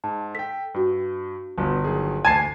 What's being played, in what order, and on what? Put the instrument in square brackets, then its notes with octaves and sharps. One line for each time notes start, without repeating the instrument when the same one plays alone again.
[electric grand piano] G#2 [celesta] A5
[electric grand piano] A4 G5 [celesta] B6
[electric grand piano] G2 [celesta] D4 F#4
[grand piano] G1 [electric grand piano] G2 B2
[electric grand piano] D#3 F#3 G#4
[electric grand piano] D2 [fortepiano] G#5 A5 [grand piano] G#6 C7